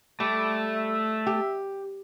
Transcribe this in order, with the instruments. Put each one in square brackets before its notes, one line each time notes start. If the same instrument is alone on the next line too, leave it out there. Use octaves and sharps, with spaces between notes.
[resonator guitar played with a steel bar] G3 [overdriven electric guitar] A3 [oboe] D6
[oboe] E5
[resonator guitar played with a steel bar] G4